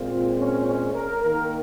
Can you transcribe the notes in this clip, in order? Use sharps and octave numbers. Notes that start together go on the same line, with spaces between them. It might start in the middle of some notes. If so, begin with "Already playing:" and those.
Already playing: A#2 G#3 C4 F4
C#4
C#4
A#4
D#3 A#3 A#4